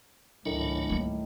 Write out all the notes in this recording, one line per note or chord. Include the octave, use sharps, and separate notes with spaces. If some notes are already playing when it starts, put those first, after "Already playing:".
G#1 C#2 A2 D#3 F#3 A3 D4 E4
G3 A#3